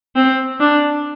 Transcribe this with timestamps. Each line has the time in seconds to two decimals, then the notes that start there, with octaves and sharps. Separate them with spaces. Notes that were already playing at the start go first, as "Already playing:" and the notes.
0.15 C4
0.60 D4